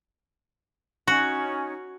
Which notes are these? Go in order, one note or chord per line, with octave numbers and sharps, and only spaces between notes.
C#4 D#4 F#4